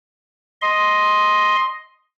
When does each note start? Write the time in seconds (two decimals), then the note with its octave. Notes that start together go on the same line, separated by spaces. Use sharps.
0.62 D#5 C6